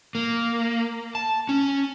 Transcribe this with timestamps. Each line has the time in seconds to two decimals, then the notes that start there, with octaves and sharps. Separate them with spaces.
0.15 A#3
1.15 A5
1.49 C#4